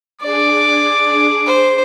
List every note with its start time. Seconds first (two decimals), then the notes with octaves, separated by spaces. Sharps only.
0.21 D4 G#4 D5 D6
1.46 C5